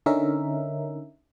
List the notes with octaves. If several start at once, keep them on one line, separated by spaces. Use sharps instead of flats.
D3 C#4 D#4 A#4 E5